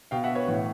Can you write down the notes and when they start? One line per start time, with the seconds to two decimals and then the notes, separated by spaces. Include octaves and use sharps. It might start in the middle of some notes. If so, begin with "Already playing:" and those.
0.11 B2 F5 G5
0.24 E5 F#5
0.35 B4 C#5
0.47 A2 E3